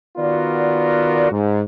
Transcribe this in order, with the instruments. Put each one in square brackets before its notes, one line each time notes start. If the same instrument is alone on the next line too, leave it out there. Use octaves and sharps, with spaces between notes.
[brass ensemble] D#3 B3 F4 F#4 A#4 D5
G#2